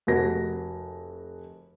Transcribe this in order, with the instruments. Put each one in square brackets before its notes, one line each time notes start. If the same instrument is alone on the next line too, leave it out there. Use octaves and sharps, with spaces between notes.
[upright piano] F1 F#4 A#4 A#6